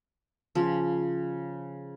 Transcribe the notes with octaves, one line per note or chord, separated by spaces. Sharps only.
C#3 F3